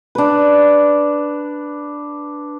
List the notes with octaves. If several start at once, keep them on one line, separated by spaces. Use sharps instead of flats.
D4 B4